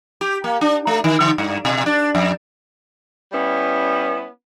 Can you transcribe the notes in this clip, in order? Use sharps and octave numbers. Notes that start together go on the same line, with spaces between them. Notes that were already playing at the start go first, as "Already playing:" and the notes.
G4
A#3
D4
A3
D#3
D3
G2
B2
D4
F2
G3 B3 C#4 E4